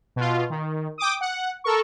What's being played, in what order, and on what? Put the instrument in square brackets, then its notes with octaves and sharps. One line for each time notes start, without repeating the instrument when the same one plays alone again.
[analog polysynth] B2 F4
D#3
G5 D6 D#6
F#5
A4 A#4 C#6